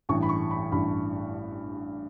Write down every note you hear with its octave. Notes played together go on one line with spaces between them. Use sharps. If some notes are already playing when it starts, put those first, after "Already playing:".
A1 G2 E3 C#6
B5
C#6
B5
A1 G2 E3 B5